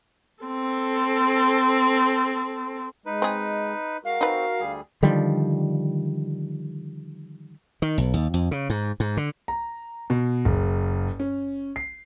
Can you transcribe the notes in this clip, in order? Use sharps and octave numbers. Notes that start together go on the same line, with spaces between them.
C4 A4
G#3 D#4 B4
C4 G#4
G#3 F#4 A#4 F5
C4 D#4 B4
D2 G3 G#4
D3 D#3 F3 G3
D#3
B1
D#2
F2
C#3
G#2
G#2
D3
A#5
B2
F#1
C#4
C7